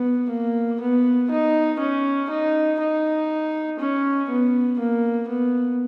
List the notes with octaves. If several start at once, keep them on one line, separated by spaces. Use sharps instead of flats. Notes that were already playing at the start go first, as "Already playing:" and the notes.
Already playing: B3
A#3
B3
D#4
C#4
D#4
D#4
C#4
B3
A#3
B3